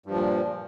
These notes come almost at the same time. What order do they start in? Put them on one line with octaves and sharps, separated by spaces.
G2 F3 A#2